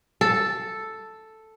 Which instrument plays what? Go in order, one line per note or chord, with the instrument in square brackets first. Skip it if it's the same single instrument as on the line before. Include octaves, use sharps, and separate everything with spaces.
[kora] A4